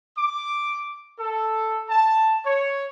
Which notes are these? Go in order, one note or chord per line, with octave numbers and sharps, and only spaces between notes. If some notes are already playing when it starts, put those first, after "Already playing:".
D6
A4
A5
C#5